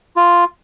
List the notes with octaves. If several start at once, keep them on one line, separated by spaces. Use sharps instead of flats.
F4